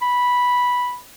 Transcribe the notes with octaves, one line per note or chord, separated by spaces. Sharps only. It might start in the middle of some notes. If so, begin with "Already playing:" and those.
B5